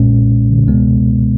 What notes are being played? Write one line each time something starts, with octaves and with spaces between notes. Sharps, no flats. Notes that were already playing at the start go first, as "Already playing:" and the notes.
Already playing: B1 A#2 G#3 C#4
C#2 B2 G#3 B3